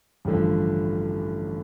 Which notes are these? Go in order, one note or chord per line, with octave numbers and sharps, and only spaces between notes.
A1 G2 D3 F3